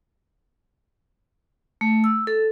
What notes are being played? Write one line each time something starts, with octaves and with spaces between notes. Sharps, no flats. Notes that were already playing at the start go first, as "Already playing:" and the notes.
A3
E6
A4